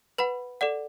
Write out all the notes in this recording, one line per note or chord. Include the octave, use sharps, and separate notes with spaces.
B4 F#5 B5
A4 D5 F#5